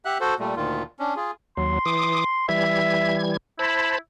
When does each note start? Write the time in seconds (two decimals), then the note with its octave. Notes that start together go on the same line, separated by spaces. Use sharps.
0.05 G4 E5 F#5 F#6
0.21 F#4 A4 C5
0.39 A#2 G3 A3
0.56 D2 A#2 D#3 F4
0.99 C#4 D4
1.16 F4 G#4
1.57 D#2 F#3 C6
1.86 E3 D6 D#6
2.49 E3 G3 E5 G#6
3.59 E4 C5 A5 B5